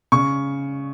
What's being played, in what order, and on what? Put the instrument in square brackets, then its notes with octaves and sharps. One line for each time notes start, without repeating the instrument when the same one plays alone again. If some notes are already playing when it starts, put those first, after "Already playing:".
[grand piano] C#3 C#6